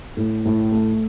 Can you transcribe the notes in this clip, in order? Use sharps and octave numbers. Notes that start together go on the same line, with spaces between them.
A2
A2
A3